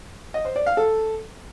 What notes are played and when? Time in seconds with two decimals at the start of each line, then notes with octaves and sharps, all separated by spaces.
0.34 D#5
0.45 C5
0.56 D5
0.66 F5
0.77 A4